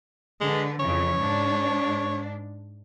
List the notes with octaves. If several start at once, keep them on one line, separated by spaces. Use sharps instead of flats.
D3 G#3 B4
F2 C#3 E3 C#5
G#2 D4